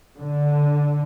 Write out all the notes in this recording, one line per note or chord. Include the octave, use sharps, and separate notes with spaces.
D3